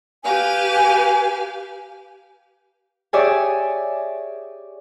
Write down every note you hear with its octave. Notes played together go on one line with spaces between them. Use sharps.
G4 B4 F5 G#5
G4 G#4 C#5 D5 E5 G#5